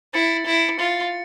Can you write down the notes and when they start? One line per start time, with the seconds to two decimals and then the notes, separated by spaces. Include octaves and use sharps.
0.14 E4 A6 C#7
0.46 E4
0.78 F4 A6 C#7